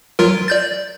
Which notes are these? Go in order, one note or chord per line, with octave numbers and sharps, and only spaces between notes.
F#3 F4 A#4
D5 G6 A6